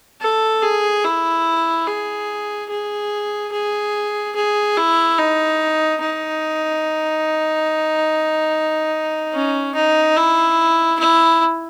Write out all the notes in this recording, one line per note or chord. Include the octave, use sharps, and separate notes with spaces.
A4
G#4
E4
G#4
G#4
G#4
G#4
E4
D#4
D#4
C#4
D#4
E4
E4